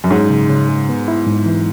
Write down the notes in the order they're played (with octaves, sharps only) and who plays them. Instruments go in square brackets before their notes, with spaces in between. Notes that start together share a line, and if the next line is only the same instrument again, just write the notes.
[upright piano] F#2
[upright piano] G#2 [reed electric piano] C#4
[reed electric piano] C#3
C#3
G#3
B3
E4
G#2
E3